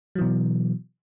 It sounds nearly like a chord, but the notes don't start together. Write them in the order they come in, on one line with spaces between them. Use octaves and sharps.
F#3 E3 B2